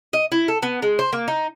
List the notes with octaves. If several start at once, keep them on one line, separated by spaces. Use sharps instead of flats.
D#5
E4
A4
B3
G#3
C5
A#3
D#4